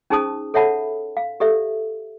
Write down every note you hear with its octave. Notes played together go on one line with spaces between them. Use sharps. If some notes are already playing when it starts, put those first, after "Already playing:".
C#4 D#4 G#4 C5 A5 D#6
A4 C#5 E5 F#5 A5 B5
F5
G4 A4 D5 E5